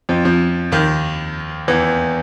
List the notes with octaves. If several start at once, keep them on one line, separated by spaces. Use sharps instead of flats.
F2 F3
F2 F3
D#2 D#3
E2 E3